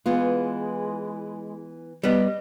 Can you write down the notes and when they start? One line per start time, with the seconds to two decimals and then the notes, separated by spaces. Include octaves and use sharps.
0.06 E3 G#3 B3 E4 F4
2.03 G3 B3 D#5